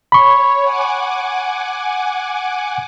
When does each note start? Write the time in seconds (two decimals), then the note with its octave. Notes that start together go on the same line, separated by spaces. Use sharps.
0.12 C#5 B5 C#6
0.64 F#5 G#5 D6